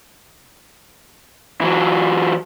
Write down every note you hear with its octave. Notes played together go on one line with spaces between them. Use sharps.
E3 F#3